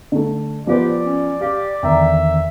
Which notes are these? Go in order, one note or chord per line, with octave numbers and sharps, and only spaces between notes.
D3 A3
F3 B3 G4 C5 D5
C#4
G4 F5
E2 D3 D#3 E5 G5 A#5